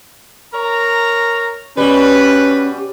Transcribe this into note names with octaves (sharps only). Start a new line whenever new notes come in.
A#4 C#5 A#5
B2 G3 C#4 B4